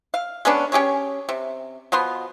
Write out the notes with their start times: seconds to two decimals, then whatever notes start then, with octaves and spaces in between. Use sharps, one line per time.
0.14 F5
0.45 G#3 B3 C#4 D4
0.72 C#4 G4 G#4 C#5
1.29 C3
1.92 B2 F3 B3 C6